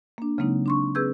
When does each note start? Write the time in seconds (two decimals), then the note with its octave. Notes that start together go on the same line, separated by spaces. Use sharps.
0.18 A#3 D4
0.38 C#3 F#3 G#3 A#3 C4 D#4
0.66 D4 C6 C#6
0.95 C4 G#4 B4 E6 G6 G#6